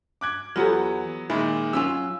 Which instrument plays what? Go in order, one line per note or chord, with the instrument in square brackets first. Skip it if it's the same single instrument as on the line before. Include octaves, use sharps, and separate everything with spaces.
[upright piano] D6 F#6 G#6
[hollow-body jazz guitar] E2 [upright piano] F#3 B3 [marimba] F4 G4 A4
[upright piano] A#2 D#3 G#3 [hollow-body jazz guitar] E4
[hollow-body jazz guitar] F#3 C#4 F4 [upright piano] E6